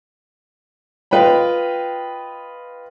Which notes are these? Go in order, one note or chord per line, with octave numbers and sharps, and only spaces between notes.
F4 B4 D#5 G5 B5